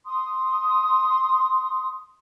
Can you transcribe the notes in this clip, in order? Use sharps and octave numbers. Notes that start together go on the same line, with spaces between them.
C6 D#6